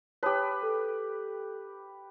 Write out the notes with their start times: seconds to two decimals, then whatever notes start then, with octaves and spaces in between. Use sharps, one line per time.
0.23 G4 B4 C#5 A5 D#6
0.62 A4